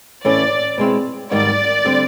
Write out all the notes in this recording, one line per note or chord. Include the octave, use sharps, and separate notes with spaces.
A2 E3 A3 C#4 D5
B2 G#3 C4 E4
G#2 D#3 G3 D5
D3 G3 C4